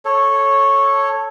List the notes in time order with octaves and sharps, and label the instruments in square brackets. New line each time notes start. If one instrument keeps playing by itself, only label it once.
[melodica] A4 C#5